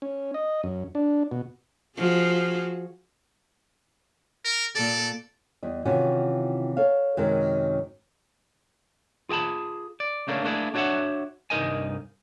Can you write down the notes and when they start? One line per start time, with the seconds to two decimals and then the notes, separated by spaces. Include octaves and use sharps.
0.02 C#4
0.34 D#5
0.63 F#2
0.95 D4
1.31 B2
1.97 F3 F#4 G#4
4.44 A#4
4.75 A#2 A4 D5
5.63 E2 G3 D#5
5.85 C3 D#3 E3 C#4 F4 F#4
6.77 A4 C#5 F5
7.17 F#2 C3 D#3 F#3 G#3
9.29 F4 G#4 G5 A5 B5
10.00 D5
10.28 C#3 A3 A#3 C#4 D4
10.43 A3 A#3 D4 E4 G#4
10.74 D4 F#4 C#5 D5 E5 F#5
11.50 C2 G2 D#4 A#4 D#5 G#5